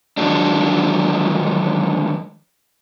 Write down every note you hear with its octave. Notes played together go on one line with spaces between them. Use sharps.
D3 D#3 F3 F#3 G#3 D4